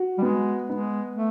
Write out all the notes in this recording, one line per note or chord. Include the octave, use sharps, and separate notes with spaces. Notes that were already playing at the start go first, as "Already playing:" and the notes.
Already playing: F#4
G3
G#3 B3
G#3 B3
A3